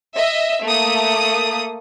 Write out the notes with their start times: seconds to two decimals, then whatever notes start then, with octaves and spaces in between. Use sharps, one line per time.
0.15 D#5 E5
0.63 A3 A#3 D#6